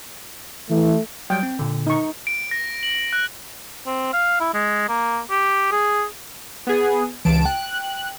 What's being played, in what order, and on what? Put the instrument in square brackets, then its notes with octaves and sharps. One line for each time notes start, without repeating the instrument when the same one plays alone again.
[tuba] E3 [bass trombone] A3
[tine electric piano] F#3 G3 [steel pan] G5
[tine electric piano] C4
A#2 D3
[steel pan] D#4 C#6
[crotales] D7
A#6
F#7
F#6
[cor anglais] C4
F5
E4
G#3
A#3
G4
G#4
[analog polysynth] B3 G#4
[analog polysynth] C#2 A5 D7 [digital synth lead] E3
[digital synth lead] G5 [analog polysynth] F#6